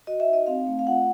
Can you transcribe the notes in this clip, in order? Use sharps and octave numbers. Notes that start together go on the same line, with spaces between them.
F#4 D#5
E5
D#4
D#5
C4 F5
A3
F5
F4 F#5